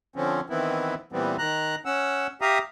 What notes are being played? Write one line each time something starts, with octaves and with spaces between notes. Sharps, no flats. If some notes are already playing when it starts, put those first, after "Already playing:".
D3 F3 C4 C#4
D#3 E3 B3 C4 E4
A#2 E3 G3 B3 C4
D#3 A#5 F#6
C#4 F#5 E6
G4 E5 F5 A#5 D#6